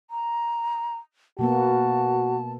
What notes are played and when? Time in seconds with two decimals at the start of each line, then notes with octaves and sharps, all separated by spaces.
0.11 A#5
1.39 B2 A#3 B3 F#4 A5